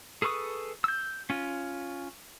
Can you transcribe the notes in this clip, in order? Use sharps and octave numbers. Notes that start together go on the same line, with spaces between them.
G#4 A4 B4 C#6 D#6
E6 G6
C#4 F4